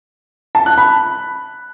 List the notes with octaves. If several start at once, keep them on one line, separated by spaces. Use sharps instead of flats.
A5
F#6
B5